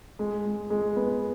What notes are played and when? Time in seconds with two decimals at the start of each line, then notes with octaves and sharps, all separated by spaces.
0.19 G#3
0.45 G#3
0.70 G#3
0.96 B3